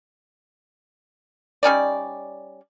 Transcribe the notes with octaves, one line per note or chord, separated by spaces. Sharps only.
G3 C#4 D#4 D5